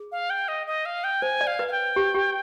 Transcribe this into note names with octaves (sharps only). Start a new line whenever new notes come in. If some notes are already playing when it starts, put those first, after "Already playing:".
Already playing: G#4
F5
G5
D#5
D#5
F5
G5
C5 G#5
D5
F5
B4
F5
G5
G4
G4